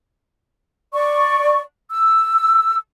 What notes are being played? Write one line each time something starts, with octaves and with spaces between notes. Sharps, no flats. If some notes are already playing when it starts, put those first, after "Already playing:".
D5 C#6
E6